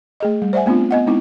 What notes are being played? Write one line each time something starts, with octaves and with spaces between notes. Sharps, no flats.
A3 G#4 D#5
G3
C5 D5 E5 F#5 G#5
A3 B3 C4 D4 F4
B3 D#5 F#5
G#3 B3 C4 D#4 E4